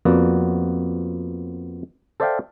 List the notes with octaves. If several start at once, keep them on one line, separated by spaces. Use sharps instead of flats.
F2 A#3 B3 F#4 D5
A4 C5 D5 E5 F5 G5